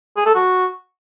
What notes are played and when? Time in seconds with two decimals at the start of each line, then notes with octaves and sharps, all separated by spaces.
0.17 G#4
0.26 A4
0.35 F#4